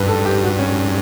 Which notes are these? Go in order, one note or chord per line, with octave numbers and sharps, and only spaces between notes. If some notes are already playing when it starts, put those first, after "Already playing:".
Already playing: G2 B4
A4
G4
F#4
C#4